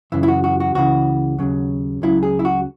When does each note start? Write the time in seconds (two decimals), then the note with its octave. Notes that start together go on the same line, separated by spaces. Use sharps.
0.12 F#2 C#3 E3 E4
0.23 E4
0.28 F#4
0.44 F#4
0.60 F#4
0.75 C#2 C#3 E3 F#4
1.39 D#2 C#3 F#3
2.02 C#2 C#3 F#3 E4
2.23 G#4
2.39 E4
2.45 F#4